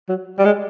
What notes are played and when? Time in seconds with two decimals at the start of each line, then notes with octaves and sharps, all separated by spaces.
0.09 F#3
0.39 G3
0.45 G#3